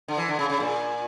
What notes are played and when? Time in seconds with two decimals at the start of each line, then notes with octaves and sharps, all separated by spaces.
0.08 D3
0.17 E3
0.28 D3
0.39 C#3
0.50 C#3
0.60 A#2